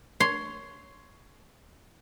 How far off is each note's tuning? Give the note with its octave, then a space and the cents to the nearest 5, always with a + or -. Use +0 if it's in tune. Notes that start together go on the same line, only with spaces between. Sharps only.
C#5 +10 C6 +0